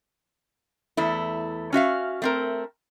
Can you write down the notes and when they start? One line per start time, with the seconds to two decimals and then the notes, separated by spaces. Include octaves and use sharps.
0.97 E2 A3 E4
1.73 C#4 F#4 E5 F5
2.22 A3 C4 A#4